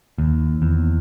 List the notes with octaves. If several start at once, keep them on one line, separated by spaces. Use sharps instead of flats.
D#2
E2